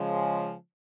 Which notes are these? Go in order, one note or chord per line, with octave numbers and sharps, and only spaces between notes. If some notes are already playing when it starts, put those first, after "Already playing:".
Already playing: C#3 F3 G#3